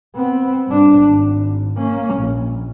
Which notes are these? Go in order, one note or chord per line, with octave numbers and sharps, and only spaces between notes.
B3 C4
G2 D4
G#1
A#3 C#4
A#1